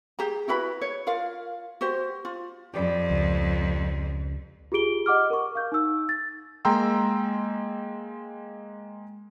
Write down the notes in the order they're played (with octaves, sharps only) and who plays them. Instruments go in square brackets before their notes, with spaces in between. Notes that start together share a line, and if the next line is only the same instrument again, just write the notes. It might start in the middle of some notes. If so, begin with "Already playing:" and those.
[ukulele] G4 G#4 A#5
E4 F#4 B4 B5
C#5
F4 A#4 F5
F#4 G4 C5
F4
[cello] F2 [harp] G4 D5 B5
[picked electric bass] C#2
[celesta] F4 G4 G#4 D7 G7
D#5 F#5 D6 F6
A#4 C#6
F5 G6
D#4 E6
A6
[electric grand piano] G#3 A#3 G5 A#5 C6 E6